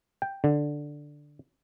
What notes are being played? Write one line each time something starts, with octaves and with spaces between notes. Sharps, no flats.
G5
D3